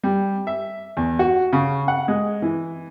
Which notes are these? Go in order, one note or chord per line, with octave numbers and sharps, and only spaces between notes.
G3
E5
E2
F#4
C#3
F#5
G#3
E3